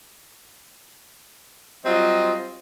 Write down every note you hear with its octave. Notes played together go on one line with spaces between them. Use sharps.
F#3 G3 C4 F4 D#5